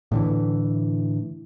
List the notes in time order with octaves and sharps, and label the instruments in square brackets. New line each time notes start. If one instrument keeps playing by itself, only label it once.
[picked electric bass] A2 D3 E3